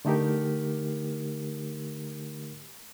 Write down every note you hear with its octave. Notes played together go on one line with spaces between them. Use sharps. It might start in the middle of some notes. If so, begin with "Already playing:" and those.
D3 A3 D#4 G4 A#4